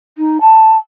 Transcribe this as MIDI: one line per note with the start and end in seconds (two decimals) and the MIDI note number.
0.18 0.38 63
0.41 0.75 81